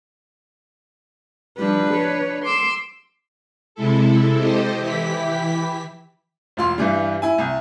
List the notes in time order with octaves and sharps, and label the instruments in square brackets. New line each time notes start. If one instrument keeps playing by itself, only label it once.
[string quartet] F3 G3 [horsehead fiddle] D4 B4
[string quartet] C#5
C6 D6 E6
[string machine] C3 G#3 E4 A4
G4 A4 C5 D#5
E3 E4 G4 B6
[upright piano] E1 F4 C6
G2 E3 G3
E4 G#5
C2